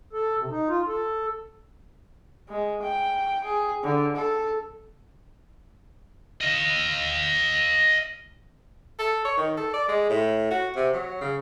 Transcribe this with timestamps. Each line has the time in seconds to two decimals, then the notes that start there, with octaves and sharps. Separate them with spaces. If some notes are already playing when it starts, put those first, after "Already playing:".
0.13 A4
0.38 C3
0.50 D#4
0.69 F4
0.88 A4
2.49 G#3
2.82 G5
3.44 G#4
3.84 D3
4.16 A4
6.41 D#5 F5
8.99 A4
9.25 C#5
9.37 D#3
9.57 A4
9.74 D5
9.88 G#3
10.10 A2
10.50 F#4
10.76 C3
10.93 F#3
11.21 C#3